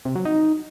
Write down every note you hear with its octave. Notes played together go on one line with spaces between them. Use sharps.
C3
F#3
D#4